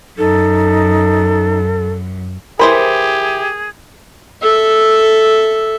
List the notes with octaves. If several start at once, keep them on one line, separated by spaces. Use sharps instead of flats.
F#2 D#4 A4
E3 G4 G#4 A#4 C5 B5
A4 E5